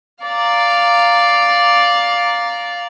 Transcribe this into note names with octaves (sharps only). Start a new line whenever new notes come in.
D5 F5 A#5